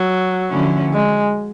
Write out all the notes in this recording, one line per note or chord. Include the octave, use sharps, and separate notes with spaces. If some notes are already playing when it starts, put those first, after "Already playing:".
Already playing: F#3
D3 F3 A3 C#4 E4
G#3